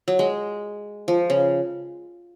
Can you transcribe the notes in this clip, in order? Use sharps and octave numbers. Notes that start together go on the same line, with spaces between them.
F#3
G#3
F3
C#3